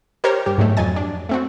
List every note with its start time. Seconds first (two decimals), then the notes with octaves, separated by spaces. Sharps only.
0.24 G4 A#4 C5 C#5 F6
0.46 G2 G4
0.58 G#2 F#3 G#3 A3
0.77 F2 F#3 D#5 G#5 A6
0.96 D4
1.29 A3 C4 F#4